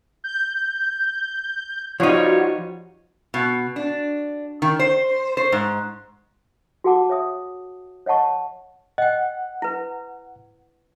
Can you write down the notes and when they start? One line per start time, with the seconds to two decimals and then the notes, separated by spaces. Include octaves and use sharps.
0.24 G6
2.00 F3 G3 D#4 F4 F#4 C#5
3.34 B2
3.76 D4
4.62 D#3
4.79 C5
5.37 C5
5.52 G#2
6.84 F#4 G#4 A#4 F#5 A5 D6
7.09 C#5 E5 D#6
8.06 C#5 D#5 F#5 A5 C#6
8.98 D#5 F#5 G5
9.62 E4 B4